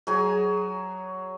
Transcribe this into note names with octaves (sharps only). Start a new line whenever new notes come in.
F#3 G#4 G#5